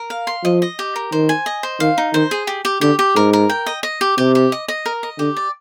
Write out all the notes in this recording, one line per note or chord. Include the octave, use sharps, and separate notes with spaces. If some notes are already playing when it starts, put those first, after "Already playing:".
Already playing: A#4
F5
C6
F3 D#5
D#5
G4
A#4
D#3 C5
G#5
D#5
C5
D#3 F5
D#4
D#3 C5
G#4
G4
G4
D3 G4
G4
G#2 A#4
A#4
G5
D#5
D#5
G4
C3 G4
G4
D#5
D#5
A#4
D#5
D3 G4
D5